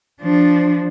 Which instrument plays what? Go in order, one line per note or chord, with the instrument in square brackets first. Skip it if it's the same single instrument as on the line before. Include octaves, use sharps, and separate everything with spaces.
[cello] F3 D4